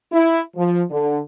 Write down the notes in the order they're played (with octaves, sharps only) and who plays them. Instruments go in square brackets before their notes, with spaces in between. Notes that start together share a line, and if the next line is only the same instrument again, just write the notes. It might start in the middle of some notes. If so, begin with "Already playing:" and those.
[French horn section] E4
F3
D3